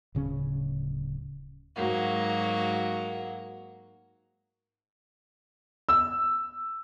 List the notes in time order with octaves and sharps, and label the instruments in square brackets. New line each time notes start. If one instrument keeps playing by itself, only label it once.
[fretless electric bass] D1 C#3 C#4
[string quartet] G#2 F#3 A#3 F#4
[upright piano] E6